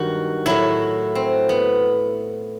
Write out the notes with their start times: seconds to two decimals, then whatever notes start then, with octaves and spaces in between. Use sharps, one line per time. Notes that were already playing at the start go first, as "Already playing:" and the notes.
Already playing: G2 D#3 F#3 F#4
0.46 A2 F#3 E4
1.15 C4
1.49 B3